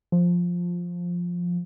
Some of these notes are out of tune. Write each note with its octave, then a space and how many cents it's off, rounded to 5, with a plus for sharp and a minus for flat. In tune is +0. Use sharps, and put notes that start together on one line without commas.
F3 +5